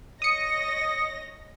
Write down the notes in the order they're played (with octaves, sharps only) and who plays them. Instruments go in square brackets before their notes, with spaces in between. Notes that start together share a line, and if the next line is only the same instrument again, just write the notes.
[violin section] C#5 D#5 A#6 [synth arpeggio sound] D#6 C#7